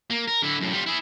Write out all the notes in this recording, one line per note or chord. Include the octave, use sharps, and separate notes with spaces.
A#3
A#4
D3 E4
F#2 A2
G3 F4
E4 G#4